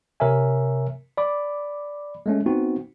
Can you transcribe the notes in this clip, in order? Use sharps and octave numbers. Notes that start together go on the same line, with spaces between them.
C3 A#4 C#5 E5 G#5
D5 B5 D6
G#3 A3 C#4
B3 C4 D#4 F#4